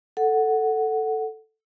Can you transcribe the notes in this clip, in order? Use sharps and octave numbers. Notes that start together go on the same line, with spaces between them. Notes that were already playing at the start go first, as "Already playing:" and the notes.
A4 F#5